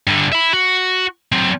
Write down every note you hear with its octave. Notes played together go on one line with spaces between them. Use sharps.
G2 D3
E5 B5
F#4
F#3 C4